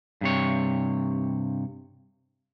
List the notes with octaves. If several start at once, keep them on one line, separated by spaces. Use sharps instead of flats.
G2 C3 C#5